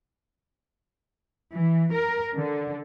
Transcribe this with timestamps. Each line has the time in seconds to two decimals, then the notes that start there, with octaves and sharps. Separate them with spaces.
1.53 E3
1.93 A#4
2.36 D3